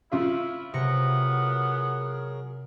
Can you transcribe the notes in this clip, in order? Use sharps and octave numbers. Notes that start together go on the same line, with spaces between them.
C#3 E4 F4 E5
C3 F#3 B3 G#4 A#4 A#6 C#7